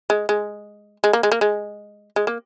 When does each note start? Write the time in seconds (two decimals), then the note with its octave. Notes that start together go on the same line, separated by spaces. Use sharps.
0.10 G#3
0.29 G#3
1.04 G#3
1.13 A#3
1.23 G#3
1.32 A#3
1.41 G#3
2.16 G#3
2.27 A#3